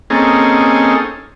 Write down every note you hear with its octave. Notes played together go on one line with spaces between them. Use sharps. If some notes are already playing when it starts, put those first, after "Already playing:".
A#3 C4 C#4 D#4 G#4 A4